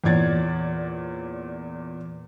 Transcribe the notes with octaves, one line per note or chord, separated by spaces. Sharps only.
E2 A#2 C#5 D5 G#6 A6